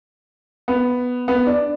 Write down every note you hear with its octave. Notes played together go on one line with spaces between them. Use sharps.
B3
B3
D4